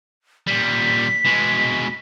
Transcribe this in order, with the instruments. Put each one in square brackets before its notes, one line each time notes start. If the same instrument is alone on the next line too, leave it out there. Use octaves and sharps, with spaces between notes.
[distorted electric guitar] A#2 G3 [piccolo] B6
[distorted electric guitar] B2 G#3